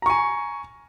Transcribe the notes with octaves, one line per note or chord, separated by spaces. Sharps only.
G#5 A#5 C#6